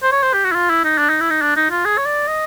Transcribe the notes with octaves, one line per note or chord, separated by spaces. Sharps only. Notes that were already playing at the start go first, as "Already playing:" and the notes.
C5
C#5
C5
G4
F#4
E4
F4
E4
D#4
D4
D#4
E4
D#4
D4
D#4
F4
G#4
C#5
D5
D#5